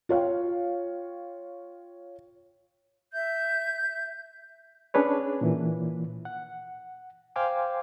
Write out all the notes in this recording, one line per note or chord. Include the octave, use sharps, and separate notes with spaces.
F4 C#5 F5 G5
E5 G6
C#4 D4 G#4 B4 C#5
A#2 E3
F#5
C5 F5 G5 G#5 C6 D6